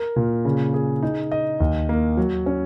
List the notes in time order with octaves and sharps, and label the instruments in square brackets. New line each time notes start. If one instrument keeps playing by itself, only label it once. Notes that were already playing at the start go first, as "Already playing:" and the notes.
Already playing: [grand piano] A#4
A#2
C#3
G#4
D#4
D#5
D#2
A#3
F#3
C#4